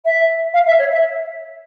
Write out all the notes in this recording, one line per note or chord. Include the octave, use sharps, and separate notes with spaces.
E5
F5
E5
C#5
E5